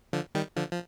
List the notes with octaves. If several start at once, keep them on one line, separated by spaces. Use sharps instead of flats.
D3 F3
D#3 G3
D3 F3
F3